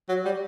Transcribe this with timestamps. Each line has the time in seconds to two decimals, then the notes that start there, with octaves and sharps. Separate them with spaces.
0.09 F#3
0.25 G3